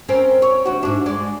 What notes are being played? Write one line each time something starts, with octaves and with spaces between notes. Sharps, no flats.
C4 C#4 A#4
C#5
D2 F#4
G#2 D4
G#3 D5